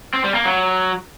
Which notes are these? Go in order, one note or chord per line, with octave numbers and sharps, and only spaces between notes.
C4
G3
A#3
F#3